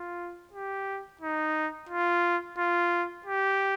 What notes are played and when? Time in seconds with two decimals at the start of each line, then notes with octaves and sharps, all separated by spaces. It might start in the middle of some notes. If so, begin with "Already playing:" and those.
Already playing: F4
0.53 G4
1.21 D#4
1.89 F4
2.58 F4
3.26 G4